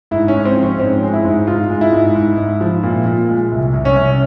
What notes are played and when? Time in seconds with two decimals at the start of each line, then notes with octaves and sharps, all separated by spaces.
0.11 G#2 E4
0.28 C#4
0.34 G#3
0.45 C4
0.57 F3
0.63 C#4
0.80 G#2 C4
1.03 G#3
1.13 E4
1.25 G#2
1.47 G#2 F4
1.70 G#3
1.81 E4
1.93 G#2
2.15 G#2
2.37 G#2
2.61 F3
2.83 A#2
3.06 A#2
3.29 G#3
3.52 C2
3.74 C2
3.85 C#4
3.96 C2